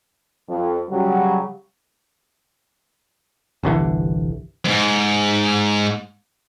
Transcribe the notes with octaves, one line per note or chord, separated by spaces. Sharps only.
F2
C#3 F#3 G3
G1 C2 D3 E3
F2 G#2